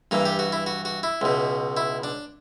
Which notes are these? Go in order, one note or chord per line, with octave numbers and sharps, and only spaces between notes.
G2 E3 A#3
G4
F#4
E4
F#4
F#4
E4
C#2 B2
E4
D4